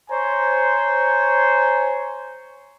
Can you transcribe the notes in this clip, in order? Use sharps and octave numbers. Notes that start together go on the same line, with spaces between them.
C5 C#5 G#5 A#5